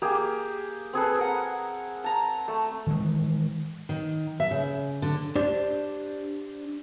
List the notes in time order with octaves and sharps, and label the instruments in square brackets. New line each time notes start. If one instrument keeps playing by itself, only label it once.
[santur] A#3 G4 G#4
C4 G#4 A4 B4
A#4 F#5
A5 A#5
A3
[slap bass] D#3 E3 G#3
[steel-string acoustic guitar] D#3
E5
C#3
D3
[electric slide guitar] D4 G4 C5 D5